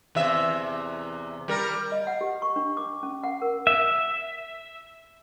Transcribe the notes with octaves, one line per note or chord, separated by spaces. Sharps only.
E2 C3 E5
G3 A#4
D#5
F#5
G4
C#6
D4
D6
C#4
F#5
A#4
E5